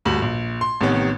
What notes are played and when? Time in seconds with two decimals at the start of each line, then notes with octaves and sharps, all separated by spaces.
0.05 D#1 D2 G2 F#7
0.22 A#1
0.61 C6
0.81 A1 C3 D#3 B3 C#5